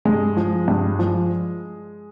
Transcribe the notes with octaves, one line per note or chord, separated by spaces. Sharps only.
G2 G#3
F3
G2
F3